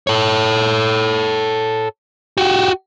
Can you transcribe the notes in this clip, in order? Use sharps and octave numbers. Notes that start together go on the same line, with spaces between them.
A4 C#5
F#4 G4